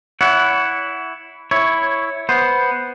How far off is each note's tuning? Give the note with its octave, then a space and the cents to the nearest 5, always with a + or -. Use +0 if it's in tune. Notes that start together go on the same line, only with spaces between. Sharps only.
E4 +0 C#5 +35 F#5 +0
E4 +0 C#5 +0
B3 +0 C5 +0